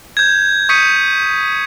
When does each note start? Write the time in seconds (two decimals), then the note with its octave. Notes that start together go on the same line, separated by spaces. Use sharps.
0.17 G6 G#6
0.69 C#6 D#6 G6 B6 C#7 D#7